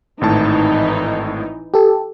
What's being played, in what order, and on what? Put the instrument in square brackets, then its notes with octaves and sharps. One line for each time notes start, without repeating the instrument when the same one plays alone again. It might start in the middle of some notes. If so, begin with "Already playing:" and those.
[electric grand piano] G#1 A2 A5 [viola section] E3 D#4
[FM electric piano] G4 A4